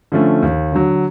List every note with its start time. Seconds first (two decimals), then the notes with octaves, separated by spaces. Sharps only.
0.12 D3 F3 A3 C#4
0.42 D#2
0.72 D3 F#3